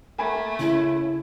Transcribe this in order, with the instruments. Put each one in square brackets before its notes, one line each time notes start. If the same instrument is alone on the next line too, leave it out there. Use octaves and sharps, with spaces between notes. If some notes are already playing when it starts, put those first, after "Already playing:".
[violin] A3 [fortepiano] A#3 G#5 B5
[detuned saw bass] C#3 [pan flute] E4